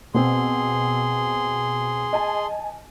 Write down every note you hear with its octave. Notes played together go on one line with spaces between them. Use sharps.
B2 C4 G#4 C6
D#5 G#5 A5